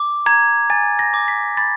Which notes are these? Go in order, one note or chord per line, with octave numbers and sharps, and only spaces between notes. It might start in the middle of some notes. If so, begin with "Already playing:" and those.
Already playing: D6
A#5 G#6
G#5 A6
A#6
D6
B6
B5 A6